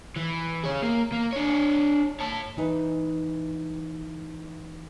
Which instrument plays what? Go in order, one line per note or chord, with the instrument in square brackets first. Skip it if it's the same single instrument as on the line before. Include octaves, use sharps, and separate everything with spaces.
[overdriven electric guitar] E3
G#4 C#5
A#3
A#3
D4 C#5
C#5 A5
[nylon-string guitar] E3 D#4 B4